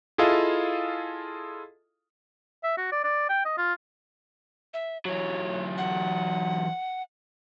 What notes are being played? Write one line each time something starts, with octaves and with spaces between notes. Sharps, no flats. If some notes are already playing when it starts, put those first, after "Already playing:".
E4 F4 G#4 A4 D#5 F5
E5
F#4
D5
D5
G5
D#5
F4
E5
E3 F#3 C#5
F#5